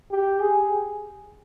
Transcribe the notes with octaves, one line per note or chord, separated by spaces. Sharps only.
G4
G#4